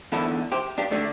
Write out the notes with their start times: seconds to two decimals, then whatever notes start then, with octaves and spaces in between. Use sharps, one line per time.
0.12 E2 D3 E4 A4
0.52 G4 C5
0.78 D4 G4
0.91 D3 A3 D4